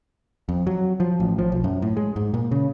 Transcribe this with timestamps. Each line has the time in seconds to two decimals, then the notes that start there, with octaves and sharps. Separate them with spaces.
0.49 F2
0.67 F#3
1.00 F3
1.20 A1
1.38 F3
1.52 B1
1.64 F#2
1.82 A2
1.97 G#3
2.16 G#2
2.34 A#2
2.51 C#3